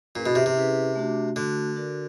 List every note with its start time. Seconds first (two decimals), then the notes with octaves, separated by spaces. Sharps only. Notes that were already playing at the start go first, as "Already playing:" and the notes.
0.15 A#2 C#4 E4 G#4 B4
0.26 B2
0.35 C3
0.46 C3
0.56 C#4 E4 G#4 B4
0.95 A3 D4 F#4
1.36 D3 A3 D4 F#4
1.76 D4 F#4 A#4 D5